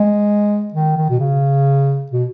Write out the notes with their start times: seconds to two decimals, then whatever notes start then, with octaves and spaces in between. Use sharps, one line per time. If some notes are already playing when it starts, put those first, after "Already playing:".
Already playing: G#3
0.74 D#3
0.97 D#3
1.10 B2
1.19 C#3
2.11 B2